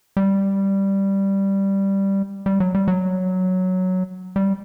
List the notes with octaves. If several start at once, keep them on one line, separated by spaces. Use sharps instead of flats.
G3
G3
F#3
G3
F#3
G3